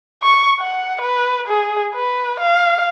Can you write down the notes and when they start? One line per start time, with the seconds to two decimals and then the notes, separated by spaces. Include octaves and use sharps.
0.22 C#6
0.60 F#5
1.01 B4
1.48 G#4
1.95 B4
2.40 F5